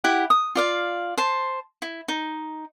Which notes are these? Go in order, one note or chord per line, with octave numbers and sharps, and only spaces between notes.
E4 G4 F#5
D#6
F4 D5 F5
C5 A5
E4
D#4